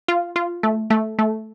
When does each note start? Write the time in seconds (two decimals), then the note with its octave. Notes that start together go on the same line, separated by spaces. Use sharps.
0.08 F4
0.36 F4
0.63 A3
0.90 A3
1.19 A3